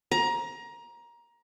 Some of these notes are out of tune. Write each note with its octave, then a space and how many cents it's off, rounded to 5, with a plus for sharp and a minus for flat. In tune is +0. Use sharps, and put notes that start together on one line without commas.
A#5 +20